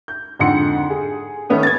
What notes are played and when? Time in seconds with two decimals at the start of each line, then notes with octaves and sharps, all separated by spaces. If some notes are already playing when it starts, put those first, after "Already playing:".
0.08 G6
0.39 F2 G#2 D3 F#5 C6 C#7
0.90 G#4
1.49 D#3 A3 B3 C#4 D#4
1.63 G#6 A6